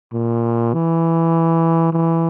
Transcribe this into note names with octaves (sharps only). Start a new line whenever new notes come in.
A#2
E3
E3